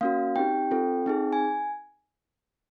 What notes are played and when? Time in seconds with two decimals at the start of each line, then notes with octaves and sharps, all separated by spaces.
0.01 A#3 C#4 F#4 F5
0.36 C4 D#4 G4 G5
0.71 C4 F4 A4
1.06 C4 D#4 G#4
1.32 G#5